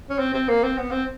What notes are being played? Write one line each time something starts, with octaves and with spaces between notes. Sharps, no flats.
C#4
C4
C4
A#3
C4
B3
C4